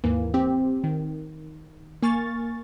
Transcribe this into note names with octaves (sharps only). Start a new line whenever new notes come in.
D#2 G#2 E3 A#3
C4 G4
D#3
A#3 G#5 C#6 F6 A6